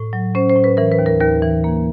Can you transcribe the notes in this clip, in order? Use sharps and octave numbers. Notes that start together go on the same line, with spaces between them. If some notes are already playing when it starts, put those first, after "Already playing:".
Already playing: A2
F#3
C#4 C5
C5
A2
B4
E3 A#4
B4
D#2
A#4
D#2 A#4
E3
A#3